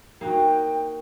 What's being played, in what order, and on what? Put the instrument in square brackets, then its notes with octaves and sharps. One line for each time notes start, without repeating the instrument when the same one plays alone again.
[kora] A#3 D#4 F#4 [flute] G5